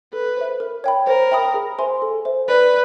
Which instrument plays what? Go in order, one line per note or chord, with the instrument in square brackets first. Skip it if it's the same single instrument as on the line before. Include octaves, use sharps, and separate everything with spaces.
[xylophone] A4 [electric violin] B4
[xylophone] C5 E5
A#4
C#5 E5 G5 B5
[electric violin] A#4 [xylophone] C5
[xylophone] E5 G5 B5 D#6
G#4
C5 E5 G#5 C6
A4
C5 E5
[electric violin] B4 [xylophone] D5